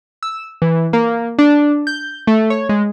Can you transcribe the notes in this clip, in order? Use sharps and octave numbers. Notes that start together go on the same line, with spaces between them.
E6
E3
A#3
D4
G6
A3
C#5
G#3